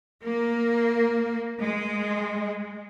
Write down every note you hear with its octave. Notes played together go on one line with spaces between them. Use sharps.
A#3
G#3